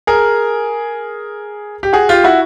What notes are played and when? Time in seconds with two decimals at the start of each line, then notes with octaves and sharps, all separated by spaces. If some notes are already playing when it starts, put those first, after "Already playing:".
0.07 G#4 A#4
1.83 G4
1.93 F#4 G#4
2.09 F4 G4
2.24 E4 F#4